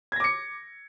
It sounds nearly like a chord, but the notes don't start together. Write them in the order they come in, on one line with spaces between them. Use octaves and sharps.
G#6 A#6 D6 C#7